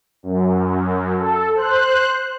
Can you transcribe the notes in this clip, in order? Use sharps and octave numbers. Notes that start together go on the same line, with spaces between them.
F#2
A4
C5 F#6